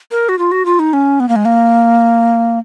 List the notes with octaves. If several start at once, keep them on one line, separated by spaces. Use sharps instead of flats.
A#4
F#4
F4
F#4
F4
D#4
C#4
B3
A#3
G#3
A#3